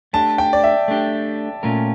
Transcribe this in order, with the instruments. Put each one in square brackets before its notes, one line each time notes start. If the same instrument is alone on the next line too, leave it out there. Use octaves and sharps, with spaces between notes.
[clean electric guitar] A3 D4 G4 [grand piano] A5
[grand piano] G5
D5
E5
[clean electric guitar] A3 D4 G4
A#2 A3 C#4 F4 A#4